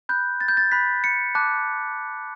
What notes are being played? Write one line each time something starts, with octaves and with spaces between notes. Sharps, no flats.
B5 F#6 G6
A6
G6
A6
B5 F#6 B6
C#7
A5 D6 F#6